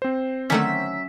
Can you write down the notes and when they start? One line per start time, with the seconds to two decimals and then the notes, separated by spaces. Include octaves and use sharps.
0.02 C4 C5
0.50 D3 D#3 F#3 A3 C#4 E5